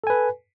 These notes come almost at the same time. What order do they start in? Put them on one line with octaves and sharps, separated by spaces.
A4 G#5 B4